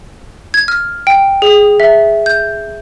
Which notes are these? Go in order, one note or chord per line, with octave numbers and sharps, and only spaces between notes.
G#6
F6
G5
G#4
E5
G6